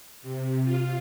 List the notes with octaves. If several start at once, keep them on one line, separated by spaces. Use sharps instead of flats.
C3
F4